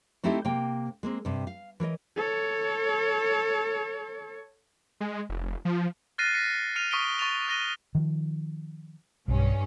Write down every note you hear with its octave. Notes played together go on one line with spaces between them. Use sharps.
A3 C4 D#4 E4 G4 A4
C3 A#3 G5
G#3 A#3 C4
G2 C3
F5
E3 A#4 C#5 D#5
A4 C#5
G#3
F1
F3
F6 F#6 A6 A#6 C7 D#7
A#6 B6 C#7 D#7
F6 C#7 D#7 F7
C#6 D#6 B6 D7 G7
C#6 A6 D#7 F7
D#6 F#6 A#6 D#7 G7
D#3 F3
B1 G2 C#4